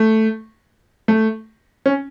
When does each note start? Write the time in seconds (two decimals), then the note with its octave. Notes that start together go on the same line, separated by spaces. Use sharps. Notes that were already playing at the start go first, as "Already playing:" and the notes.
Already playing: A3
1.08 A3
1.86 C#4